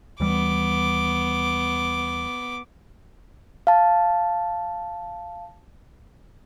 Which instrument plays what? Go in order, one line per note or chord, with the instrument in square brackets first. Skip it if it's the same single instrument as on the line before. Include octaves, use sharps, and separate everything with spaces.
[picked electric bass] D#2 E3 G3 [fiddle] B3 D6
[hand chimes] F5 A5